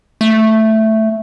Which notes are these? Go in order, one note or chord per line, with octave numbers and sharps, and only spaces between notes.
A3